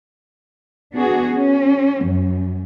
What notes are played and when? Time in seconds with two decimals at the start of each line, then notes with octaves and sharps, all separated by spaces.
0.94 B3 D4 F#4 G#4
1.35 C#4
2.02 F#2